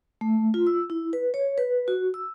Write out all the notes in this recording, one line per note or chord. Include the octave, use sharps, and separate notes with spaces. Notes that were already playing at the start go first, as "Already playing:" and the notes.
A3
F4
E6
E4
B4
C#5
B4
F#4
E6